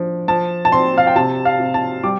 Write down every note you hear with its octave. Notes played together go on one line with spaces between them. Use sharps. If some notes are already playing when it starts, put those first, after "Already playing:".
Already playing: F3 D4
F3 A5
A5
C4 C6
F5
G5
C3 A5
F5
C3
A5
G3 D6